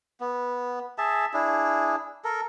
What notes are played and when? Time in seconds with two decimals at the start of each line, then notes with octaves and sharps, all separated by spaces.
0.20 B3
0.98 G#4 E5 A5
1.34 D4 E4 G#4
2.24 A4 A#4